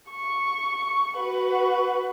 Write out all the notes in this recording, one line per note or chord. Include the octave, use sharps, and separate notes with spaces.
C#6
F#4 B4